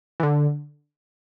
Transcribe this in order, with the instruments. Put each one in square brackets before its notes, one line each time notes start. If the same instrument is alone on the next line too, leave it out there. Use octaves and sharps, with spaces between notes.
[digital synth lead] E3
D3